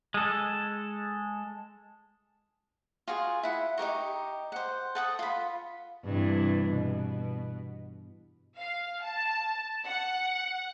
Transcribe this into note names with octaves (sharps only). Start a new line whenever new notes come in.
G#3 A4
F4 F#4 G#4
E4 F#5
D#4 G4 A#4 C#6
C5 F#5
A4 F#5 D#6
F4 B5
G2 C3 E3
B2
F5
A5
F#5